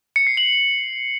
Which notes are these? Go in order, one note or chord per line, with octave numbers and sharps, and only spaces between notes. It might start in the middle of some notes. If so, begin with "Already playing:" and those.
C#7
C7
F#7